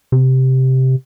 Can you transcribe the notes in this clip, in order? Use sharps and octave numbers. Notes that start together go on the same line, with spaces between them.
C3